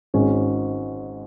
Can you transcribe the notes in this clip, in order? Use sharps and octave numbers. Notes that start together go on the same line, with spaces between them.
G#1 G#2 G#3 C#4